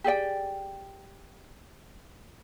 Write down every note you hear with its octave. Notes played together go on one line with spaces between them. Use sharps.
G4 G#4 D5 G5